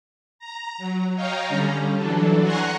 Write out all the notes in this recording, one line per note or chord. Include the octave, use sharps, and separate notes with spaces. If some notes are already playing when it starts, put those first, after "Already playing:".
A#5
F#3
C#5 D#5 F5 G5 A#5
D3 G3 C#4
E3 F#3 D4 A4
F#5 G#5 A#5 C6 C#6 F#6